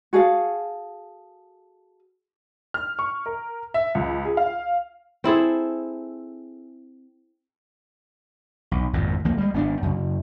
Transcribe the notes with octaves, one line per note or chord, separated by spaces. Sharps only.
F#4 G#4 A4 F5
F6
C#6
A#4
E5
C#2
G#4
F5
C4 E4 G#4 A4
B1
G#1 F2 A#2
D2 F3 A#3
G3 G#3
G#1 B3 C#4 D4
F#2 C#3